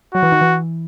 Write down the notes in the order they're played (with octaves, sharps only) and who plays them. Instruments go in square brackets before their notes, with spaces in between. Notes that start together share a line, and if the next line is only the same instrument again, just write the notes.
[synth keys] F#3 [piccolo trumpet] F#4
[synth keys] E3
D#3
E3